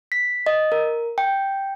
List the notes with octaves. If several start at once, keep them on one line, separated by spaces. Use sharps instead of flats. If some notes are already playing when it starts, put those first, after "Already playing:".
B6
D#5
A#4
G5